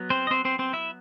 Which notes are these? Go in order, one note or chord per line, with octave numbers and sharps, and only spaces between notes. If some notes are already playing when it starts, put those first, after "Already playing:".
Already playing: F#3 B3
C4 C5
D#5
C4 C5
C4 C5
C4 C5
E4 E5